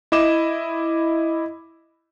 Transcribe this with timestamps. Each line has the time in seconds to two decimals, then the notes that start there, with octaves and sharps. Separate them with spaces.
0.12 E4 D#5 D6 E7